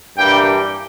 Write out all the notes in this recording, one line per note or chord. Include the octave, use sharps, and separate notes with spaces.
G2 E3 G3 A#3 G5